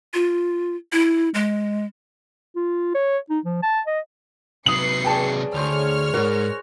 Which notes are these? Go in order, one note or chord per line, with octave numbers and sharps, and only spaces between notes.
F4
E4
G#3
F4
C#5
D#4
F3
A5
D#5
C3 F#3 B4 D#6 C7 C#7 F#7
G#4 C#5 D5 G5 A5
D2 E4 G#4 C5 C#5 F6
B1 G#2 F#4 A#4